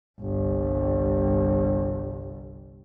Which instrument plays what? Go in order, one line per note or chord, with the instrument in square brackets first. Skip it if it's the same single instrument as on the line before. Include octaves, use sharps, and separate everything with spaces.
[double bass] G1 C2